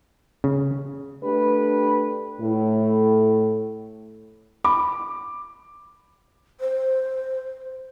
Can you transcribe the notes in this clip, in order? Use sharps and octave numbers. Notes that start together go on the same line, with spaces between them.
C#3
A3 D4 G4 B4
A2
B5 D6
C5